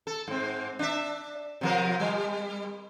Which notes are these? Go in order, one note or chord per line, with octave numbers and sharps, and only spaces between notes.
A4
G#2 C4
D4 E5
C3 F3 A#4
G3